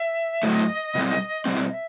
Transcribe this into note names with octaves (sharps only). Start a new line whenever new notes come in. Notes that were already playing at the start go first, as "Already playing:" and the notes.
Already playing: E5
A2 F#3 A3 D#5
B2 G3 C4
B2 G3 C4 D#5
E5